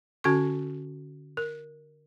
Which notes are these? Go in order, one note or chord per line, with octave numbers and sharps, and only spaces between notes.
D3 C#4 F#4 A4 C#6
A#4